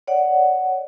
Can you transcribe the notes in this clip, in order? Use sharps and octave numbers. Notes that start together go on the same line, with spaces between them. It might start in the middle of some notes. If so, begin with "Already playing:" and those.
C#5 D5 F#5